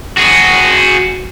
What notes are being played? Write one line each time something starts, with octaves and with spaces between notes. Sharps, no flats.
F#4 G#4